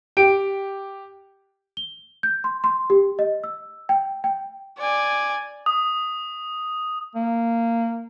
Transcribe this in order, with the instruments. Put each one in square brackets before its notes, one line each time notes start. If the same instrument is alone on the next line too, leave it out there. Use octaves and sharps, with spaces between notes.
[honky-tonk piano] G4 D7
[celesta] G7
G6
C6
C6
G4
D#5
E6
G5
G5
[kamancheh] D5 G#5
[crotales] D#6
[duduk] A#3